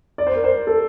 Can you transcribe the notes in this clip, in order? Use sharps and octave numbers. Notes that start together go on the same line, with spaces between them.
D5
C5
A#4
C5
A4